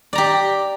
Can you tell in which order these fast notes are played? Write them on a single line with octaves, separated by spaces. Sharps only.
D5 A#5 G4